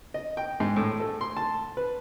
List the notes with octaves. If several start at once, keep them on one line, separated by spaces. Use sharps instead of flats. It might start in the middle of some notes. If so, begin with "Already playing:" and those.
D#5
G5
G#2
A2
A4
C6
A5
B4